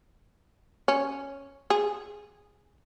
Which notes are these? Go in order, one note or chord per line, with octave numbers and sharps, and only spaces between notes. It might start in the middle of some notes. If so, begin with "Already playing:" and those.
C#4
G#4